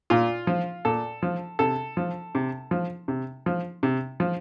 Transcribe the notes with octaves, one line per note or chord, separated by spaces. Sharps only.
A#2 F4
F3
A#2 A4
F3
C3 A4
F3
C3
F3
C3
F3
C3
F3